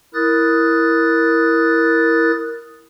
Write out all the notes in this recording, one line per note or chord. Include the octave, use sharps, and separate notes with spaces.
E4 A#4 D#6 F#6 A6